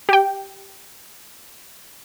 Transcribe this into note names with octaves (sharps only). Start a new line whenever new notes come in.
G4 G5